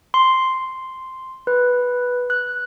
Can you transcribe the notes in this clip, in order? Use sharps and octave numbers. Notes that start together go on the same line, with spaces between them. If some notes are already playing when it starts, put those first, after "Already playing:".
C6
B4
F#6